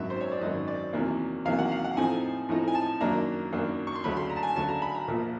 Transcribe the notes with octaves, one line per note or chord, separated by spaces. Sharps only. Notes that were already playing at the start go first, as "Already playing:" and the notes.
Already playing: G#1 F#2 D#3 F#3 E5
C5
C#5
D5
G#1 F#2 D#3 F#3 D#5
D5
E2 C3 D#3 F#3 A#3
E2 C3 D#3 F#3 A#3 F5
F#5
F5
F#5
A2 F3 A3 C4 D#4 G#5
A2 F3 A3 C4 D#4
G#5
A5
F#2 D#3 F#3 A#3 D4 A#5
F#2 D#3 F#3 A#3 D4
C#6
C6
D2 C#3 F#3 A3 B5
C6
A#5
A5
G#5
D2 C#3 F#3 A3 A5
A#5
B5
A#5
A#1 A#2 F3 A#3